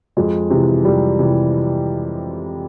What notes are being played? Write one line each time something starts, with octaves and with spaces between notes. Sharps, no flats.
F2 G#3
C3 E3
F2 G3
C3 E3